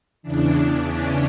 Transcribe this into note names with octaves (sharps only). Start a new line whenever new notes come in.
E2 C#3 E3 D4
C#4